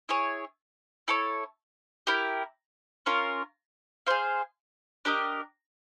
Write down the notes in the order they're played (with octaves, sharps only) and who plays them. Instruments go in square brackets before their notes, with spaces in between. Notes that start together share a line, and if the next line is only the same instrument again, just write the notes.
[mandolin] E4 G#4 C#5
E4 A4 C#5
E4 G4 A#4
C#4 F4 A#4
G#4 C5 F5
D4 G4 A#4 D#5